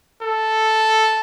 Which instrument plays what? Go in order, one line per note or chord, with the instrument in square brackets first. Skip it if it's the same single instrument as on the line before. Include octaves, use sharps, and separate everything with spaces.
[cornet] A4